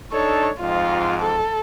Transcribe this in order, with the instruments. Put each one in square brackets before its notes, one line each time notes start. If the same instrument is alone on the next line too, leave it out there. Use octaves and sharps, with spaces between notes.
[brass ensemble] D4 D#4 A4 [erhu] C#5
[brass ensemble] F2 G#2 [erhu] F4
[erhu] A4